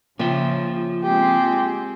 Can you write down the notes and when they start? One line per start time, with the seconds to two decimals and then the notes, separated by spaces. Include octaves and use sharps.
0.19 C#3 F3 A#3 E5 G5
1.04 G#3 C4 G4 G#4